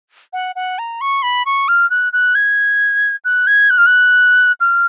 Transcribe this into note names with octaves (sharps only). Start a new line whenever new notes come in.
F#5
F#5
A#5
C#6
B5
C#6
F6
F#6
F#6
G#6
F#6
G#6
F#6
F6
F#6
F6